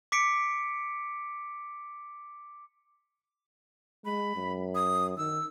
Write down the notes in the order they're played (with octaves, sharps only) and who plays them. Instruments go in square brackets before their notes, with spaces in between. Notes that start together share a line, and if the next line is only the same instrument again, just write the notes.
[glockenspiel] D6 B6 C#7 D7
[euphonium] G#3 [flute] B5
[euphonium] F#2
[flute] D#6
[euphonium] D#3 [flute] E6